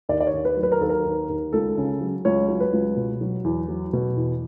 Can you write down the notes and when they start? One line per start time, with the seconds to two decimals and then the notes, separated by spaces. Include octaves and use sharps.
0.09 D#2 D5
0.20 D5
0.27 C#5
0.33 D#2
0.45 B4
0.57 F#3
0.63 B4
0.72 A#4
0.81 D#2 A4
0.90 A#4
1.05 D#2
1.29 D#2
1.53 C#2 A4
1.77 C#3
2.01 F#3
2.25 C#2 C#5
2.48 F#3
2.60 B4
2.73 C#2
2.97 B2
3.21 F#3
3.44 E2
3.68 F#3
3.93 B2
4.16 E2